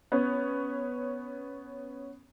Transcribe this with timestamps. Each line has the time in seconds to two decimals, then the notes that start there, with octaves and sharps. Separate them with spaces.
0.12 B3 C#4